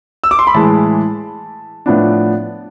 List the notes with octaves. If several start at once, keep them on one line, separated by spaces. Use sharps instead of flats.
E6
D6
C6
B5
A2 E3 G#3 A5
A2 F3 B3 D4